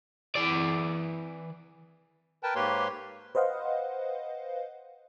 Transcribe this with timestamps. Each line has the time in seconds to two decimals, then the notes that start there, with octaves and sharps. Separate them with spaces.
0.36 E3 D5
2.43 A#4 B4 G5 A5
2.55 G#2 A#3 G4 B4 C#5 C6
3.35 B4 C5 D#5 F5 F#5